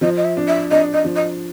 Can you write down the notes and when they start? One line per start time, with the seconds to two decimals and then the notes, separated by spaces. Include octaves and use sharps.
0.01 F3 D#5
0.17 D#5
0.24 E5
0.37 D4
0.48 E5
0.71 D4 D#5
0.93 D#5
1.04 F3
1.16 D#5